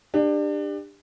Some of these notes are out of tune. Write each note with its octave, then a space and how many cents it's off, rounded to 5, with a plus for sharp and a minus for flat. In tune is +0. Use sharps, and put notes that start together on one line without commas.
D4 +25 G4 +25